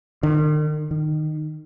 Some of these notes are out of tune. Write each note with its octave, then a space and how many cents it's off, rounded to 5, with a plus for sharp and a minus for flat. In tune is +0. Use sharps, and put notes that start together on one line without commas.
D#3 -45
D#3 -15